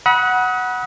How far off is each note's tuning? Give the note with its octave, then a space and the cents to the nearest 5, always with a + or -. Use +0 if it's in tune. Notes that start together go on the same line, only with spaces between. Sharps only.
F#5 +0 B5 -30 D#6 +35